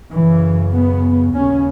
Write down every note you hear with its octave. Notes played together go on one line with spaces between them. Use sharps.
F#2 C#3 E3
B3
D#2 C#3 C#4